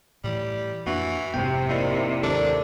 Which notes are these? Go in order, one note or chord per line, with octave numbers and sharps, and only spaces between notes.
A2 E3 G3
F2 E3 A#3 D4 F#4
F1 G#2 C3 B3 G5
D#3 A#3 E4 D5
D#2 G#2 D4 A4 A#4 D5